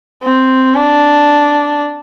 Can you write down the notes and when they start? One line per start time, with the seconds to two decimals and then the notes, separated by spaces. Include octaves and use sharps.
0.23 C4
0.74 D4